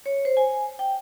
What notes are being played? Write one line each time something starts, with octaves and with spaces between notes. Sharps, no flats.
C#5
C5
G#5
G5